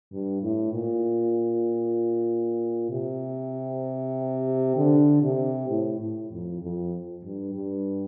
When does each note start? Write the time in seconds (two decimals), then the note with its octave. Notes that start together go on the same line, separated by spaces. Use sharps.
0.12 G2
0.42 A2
0.74 A#2
2.90 C3
4.76 D3
5.23 C3
5.69 A2
6.00 A2
6.31 F2
6.62 F2
7.24 G2
7.55 G2